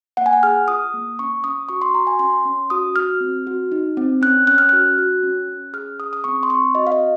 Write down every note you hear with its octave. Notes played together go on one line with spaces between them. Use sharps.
A#3 F#5
G#5
F#5
G#4 F6
F4 D#6
A#3
C#4 C#6
C#4 D#6
F#4 C#6
C6
F#4 A#5
G#5
C#4 C6
C#4
F#4 D#6
F#4 F6
C4
F#4
D#4
C4
C#4 F#6
C#4 F#6
F6
F#4 F#6
F#4
C#4
C#4
G#4 F6
G#4 D#6
D#6
C4 C#6
C6
C4 C#6
F#4 D#5
F5
D#5
F#4